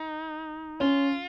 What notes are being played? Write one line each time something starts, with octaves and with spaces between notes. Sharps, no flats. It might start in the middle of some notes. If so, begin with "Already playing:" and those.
Already playing: D#4
C#4 F4